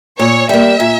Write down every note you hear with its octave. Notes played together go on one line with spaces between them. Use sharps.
A#2 C#5
G3 A#3 E5
A#2